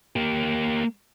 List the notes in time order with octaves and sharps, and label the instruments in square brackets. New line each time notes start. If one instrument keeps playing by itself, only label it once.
[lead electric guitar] A#3 G4